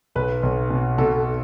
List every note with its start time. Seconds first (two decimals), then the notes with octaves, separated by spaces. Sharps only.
0.15 B1 B4
0.43 B1
0.70 B2
0.98 B2 A4